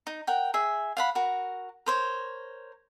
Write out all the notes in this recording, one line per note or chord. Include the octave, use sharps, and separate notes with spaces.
D#4
A#4 F#5 G5
G#4 E5
F5 F#5 B5
F#4 A#4
A#4 C5 C#5